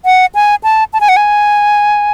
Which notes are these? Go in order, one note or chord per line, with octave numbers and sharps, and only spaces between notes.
F#5
G#5
A5
A5
G#5
F#5
G#5